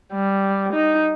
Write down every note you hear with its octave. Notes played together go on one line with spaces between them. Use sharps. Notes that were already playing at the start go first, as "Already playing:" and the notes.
G3
D#4